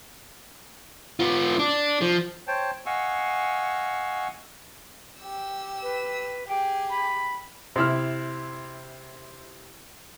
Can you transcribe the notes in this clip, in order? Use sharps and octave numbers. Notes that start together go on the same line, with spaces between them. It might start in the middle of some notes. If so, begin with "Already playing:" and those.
B3 F4
D4
F3
C5 C#5 G5 A5
D#5 F5 F#5 G#5 C#6 E6
G4 E6
B4
G4 G#4 G5
B5
C3 E4 F6